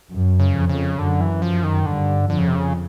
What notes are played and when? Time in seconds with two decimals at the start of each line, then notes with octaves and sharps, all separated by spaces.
0.11 F#2
0.39 C#3
0.54 F2
0.69 C#3
0.98 F#2 D3
1.21 E3
1.42 F3
1.64 D#3
1.85 G2 D3
2.29 F2 D3
2.38 C#3
2.48 C3
2.55 C#3